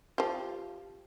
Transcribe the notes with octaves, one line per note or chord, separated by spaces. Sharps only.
F3 G4